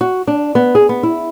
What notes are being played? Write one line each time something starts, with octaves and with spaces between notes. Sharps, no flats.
F#4
D4
B3
G#4
B3
E4